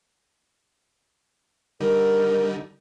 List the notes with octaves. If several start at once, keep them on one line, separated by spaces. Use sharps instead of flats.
D3 G3 D#4 A#4